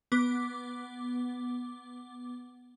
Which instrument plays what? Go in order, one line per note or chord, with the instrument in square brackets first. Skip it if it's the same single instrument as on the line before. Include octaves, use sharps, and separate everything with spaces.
[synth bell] B3 D6